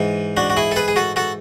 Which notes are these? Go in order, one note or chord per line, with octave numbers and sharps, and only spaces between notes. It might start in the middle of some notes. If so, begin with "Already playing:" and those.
Already playing: G#2 E3
D4 F#4
F#4
E4 G#4
A4
G#4 B4
G#4
F#4 A4
F#4 A4